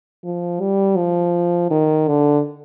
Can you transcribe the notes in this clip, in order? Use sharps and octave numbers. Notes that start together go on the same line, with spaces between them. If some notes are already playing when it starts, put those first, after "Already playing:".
F3
G3
F3
D#3
D3